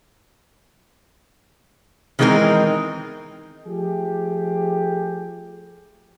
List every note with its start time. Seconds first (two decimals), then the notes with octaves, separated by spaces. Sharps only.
2.19 D#3 E3 G#3 C4 D#4 A#4
3.67 F3 A3 G4 G#4